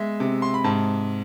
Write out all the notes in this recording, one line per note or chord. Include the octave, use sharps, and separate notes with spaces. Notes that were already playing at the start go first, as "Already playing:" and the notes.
Already playing: G#3 B3 E5
C3
C6
B5
G#2 A5